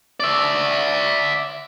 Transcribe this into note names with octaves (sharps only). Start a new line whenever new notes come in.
D5 E5